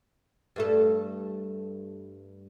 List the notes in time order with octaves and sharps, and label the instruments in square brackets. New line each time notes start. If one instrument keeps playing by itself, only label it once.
[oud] G2 A3 A4